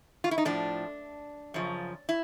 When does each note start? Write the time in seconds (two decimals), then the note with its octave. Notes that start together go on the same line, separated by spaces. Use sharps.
0.24 F4
0.31 E4
0.38 D#4
0.45 A2 F3 D4
1.54 F#2 C#3 F3
2.09 E4